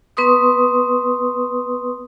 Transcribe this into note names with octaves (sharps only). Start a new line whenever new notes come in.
B3 B4 C6 C#6 D#6